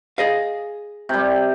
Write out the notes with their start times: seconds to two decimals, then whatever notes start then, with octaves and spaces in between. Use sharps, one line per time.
0.18 G#4 D#5 F5
1.09 C3 G3